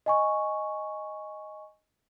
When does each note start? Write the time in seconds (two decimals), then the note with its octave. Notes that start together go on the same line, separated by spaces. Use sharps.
0.06 D#5 G#5 C#6